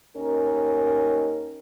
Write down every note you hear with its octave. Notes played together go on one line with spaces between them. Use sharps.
D#2 C#4 D#4 A#4